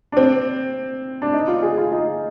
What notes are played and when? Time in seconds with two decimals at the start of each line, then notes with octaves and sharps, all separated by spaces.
0.12 D4
0.17 C4
1.22 D4
1.33 D#4
1.48 F4
1.63 G#4
1.78 F4
1.92 D#4